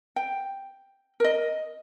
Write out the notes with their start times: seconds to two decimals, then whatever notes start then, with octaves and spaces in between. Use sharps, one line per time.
0.16 G5
1.20 A#4 D#5